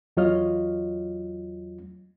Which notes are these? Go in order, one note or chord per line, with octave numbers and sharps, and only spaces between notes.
E2 F#3 F4 C#5 D#5 F6